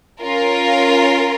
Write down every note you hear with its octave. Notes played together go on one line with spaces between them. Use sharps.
C#4 F4 A#4